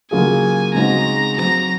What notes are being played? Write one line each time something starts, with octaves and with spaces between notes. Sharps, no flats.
C#3 F#3 A#3 F4 G#4 G#5
C#3 G#3 C4 D#4 F#4 A#5
F#3 C4 F#4 A#5